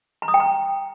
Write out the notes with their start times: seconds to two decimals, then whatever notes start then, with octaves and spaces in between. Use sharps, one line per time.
0.22 A#5
0.28 D#6
0.34 G5
0.40 A#5